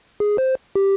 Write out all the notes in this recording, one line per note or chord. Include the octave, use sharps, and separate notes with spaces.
G#4
C5
G4